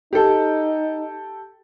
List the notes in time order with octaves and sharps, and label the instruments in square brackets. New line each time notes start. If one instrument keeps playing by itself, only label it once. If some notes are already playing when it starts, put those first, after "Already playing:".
[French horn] D#4 [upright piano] G4 A4